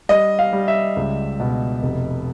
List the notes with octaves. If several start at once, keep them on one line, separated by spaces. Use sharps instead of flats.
G3 D#5
F5
G3
E5
C#2
B2
F1